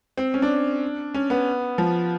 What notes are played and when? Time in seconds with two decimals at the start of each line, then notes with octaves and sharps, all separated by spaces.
0.17 C4
0.34 C#4
0.42 D4
1.14 C#4
1.30 B3
1.78 F3